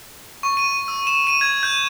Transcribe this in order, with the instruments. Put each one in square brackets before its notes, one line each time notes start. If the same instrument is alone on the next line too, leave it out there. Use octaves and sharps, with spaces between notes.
[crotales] C#6
D#7
E6
E7
D#7
G#6
G6